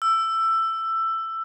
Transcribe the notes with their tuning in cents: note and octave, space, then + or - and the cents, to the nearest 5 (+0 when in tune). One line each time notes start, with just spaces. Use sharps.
E6 +15